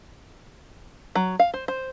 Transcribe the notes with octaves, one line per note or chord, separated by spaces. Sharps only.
F#3
F5
C5
C5